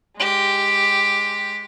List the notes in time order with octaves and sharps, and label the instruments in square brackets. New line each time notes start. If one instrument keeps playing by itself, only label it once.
[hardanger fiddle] G#3 G4